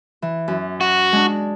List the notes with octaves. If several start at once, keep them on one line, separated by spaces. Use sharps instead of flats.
E3
F#2
F#4
G#3 D4